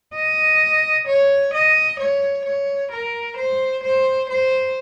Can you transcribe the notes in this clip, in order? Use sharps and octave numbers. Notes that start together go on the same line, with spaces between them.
D#5
C#5
D#5
C#5
C#5
A#4
C5
C5
C5